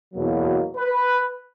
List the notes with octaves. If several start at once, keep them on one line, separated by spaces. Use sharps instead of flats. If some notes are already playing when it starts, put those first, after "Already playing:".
E2 B2 F#3 A#3
B4